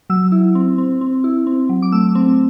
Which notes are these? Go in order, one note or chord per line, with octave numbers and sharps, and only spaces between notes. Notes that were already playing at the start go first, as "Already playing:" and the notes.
F#3 E6
E4
C4
C4
C4
E4
C4
F#3
D6
A3 E6
C4